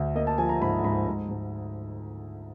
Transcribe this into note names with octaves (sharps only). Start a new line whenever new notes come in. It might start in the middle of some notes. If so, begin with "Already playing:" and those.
Already playing: D2
A#3 D#5
A5
F3 G#5
A#5
G#2 B5
G#2 B5
G#2
G#2